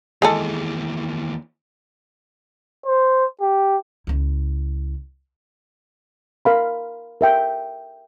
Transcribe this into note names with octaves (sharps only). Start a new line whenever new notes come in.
D#2 E3 G#3 G#4 A4
C5
G4
C#2 E4
A#4 F5 B5
A#4 E5 G5